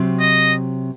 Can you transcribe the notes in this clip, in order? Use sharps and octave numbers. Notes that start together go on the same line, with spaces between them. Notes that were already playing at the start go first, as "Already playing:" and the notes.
Already playing: C3 F#3 C4
D#5